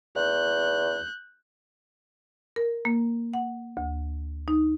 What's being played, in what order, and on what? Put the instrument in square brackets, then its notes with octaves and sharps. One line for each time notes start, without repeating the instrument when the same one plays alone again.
[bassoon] E2 [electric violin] F#6 G6
[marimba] A#4
A#3
F#5
D2
D#4